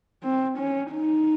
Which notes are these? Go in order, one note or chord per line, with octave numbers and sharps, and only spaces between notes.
C4
C#4
D#4